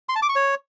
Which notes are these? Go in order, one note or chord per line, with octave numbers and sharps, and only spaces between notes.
C6
A5
D6
C#6
C#5